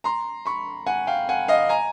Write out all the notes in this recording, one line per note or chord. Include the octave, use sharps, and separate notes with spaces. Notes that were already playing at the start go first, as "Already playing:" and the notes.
A#5 C6
B5 C#6
F#5 G#5
F5 G5
F#5 G#5
D#5 F5
G#5 A#5